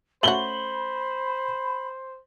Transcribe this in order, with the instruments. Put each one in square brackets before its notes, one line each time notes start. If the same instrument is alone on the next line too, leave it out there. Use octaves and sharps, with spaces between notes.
[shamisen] A3 C#4 F#4 [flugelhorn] C5 [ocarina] B5 [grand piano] F#7 G7